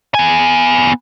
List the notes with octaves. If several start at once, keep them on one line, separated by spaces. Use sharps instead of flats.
B3 G#5